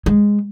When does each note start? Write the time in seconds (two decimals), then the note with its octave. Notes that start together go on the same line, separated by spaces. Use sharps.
0.06 G#3